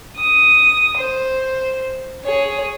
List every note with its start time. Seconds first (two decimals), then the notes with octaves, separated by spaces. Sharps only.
0.17 D#6
0.97 C5
2.24 G#4 C#5